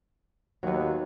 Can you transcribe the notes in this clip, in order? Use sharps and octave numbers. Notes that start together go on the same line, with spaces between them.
D#2 F#3 B3